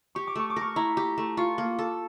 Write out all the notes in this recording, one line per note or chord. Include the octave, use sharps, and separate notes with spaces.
G4 C#6
D6
A3 C#6
D6
A#4 C#6
E4 A#5
G4
A3
F4 C#6
A#3
A4